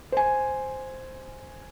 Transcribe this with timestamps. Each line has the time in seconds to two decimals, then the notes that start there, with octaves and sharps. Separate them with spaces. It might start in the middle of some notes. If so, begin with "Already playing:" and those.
0.12 C5 G#5